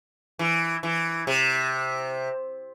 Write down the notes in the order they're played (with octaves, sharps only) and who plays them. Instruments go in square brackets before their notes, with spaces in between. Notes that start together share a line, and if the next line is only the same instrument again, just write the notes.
[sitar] E3
E3
C3